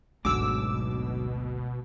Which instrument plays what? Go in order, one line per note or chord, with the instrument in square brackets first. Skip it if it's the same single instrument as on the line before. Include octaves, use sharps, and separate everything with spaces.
[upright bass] G#1 D2 [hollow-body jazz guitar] G#2 D3 F#3 [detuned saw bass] B2 [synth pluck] D6 E6